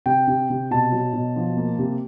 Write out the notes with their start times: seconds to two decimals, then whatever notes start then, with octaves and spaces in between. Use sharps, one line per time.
0.06 C3 G5
0.28 C3
0.50 C3
0.71 B2 A5
0.92 F#3
1.13 B2
1.36 F3
1.57 A#3
1.79 C3